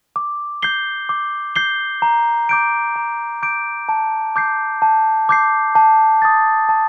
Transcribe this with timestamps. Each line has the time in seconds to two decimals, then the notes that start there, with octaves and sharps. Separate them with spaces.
0.16 D6
0.62 G6 C7 G7
1.09 D6
1.56 G6 C7 G7
2.02 A#5
2.49 D6 G6 D7
2.96 A#5
3.43 D6 G6 D7
3.89 A5
4.36 D6 G6 C7
4.82 A5
5.29 D6 G6 C7
5.75 A5
6.22 D#6 A6
6.69 A5